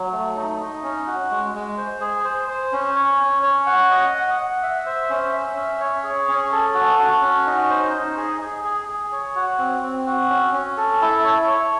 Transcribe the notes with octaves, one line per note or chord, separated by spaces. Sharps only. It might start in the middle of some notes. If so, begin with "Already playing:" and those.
Already playing: F#3
A3
D#4
D#4
C#4
F#4
G#3
G#3
C5
G#4
C5
C5
C#4
C#5
C#4
C#5
F#5
D#5
F#5
F#5
E5
C5
C#4
E5
C#4
C#5
G#4
C#4
A4
F#4
F#4
C#4
D#4
C5
D#4
G#4
G#4
G#4
G#4
C#5
F#4
C4
C4
F#4
C#4
C#4
A4
E4
C#5
C#5